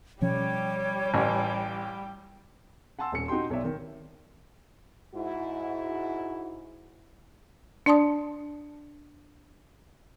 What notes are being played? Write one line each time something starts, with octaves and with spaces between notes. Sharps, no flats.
B2 F3 G3 C#4 G4 C#5
A1
F#5 G#5 A5 C6 E6
D#1 C#4 C#5 C#7
D#4 F#4 G4 G5 C6
B1 C#5 D5 E5
D#3
G#2 E4 F#4
D4 D5 A5 C6 D#6